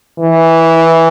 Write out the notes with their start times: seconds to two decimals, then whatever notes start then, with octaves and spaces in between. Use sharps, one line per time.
0.19 E3